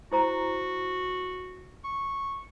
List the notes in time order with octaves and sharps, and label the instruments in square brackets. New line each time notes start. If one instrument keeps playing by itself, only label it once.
[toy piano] E4 C5 A#5 [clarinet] F#4
[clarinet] C#6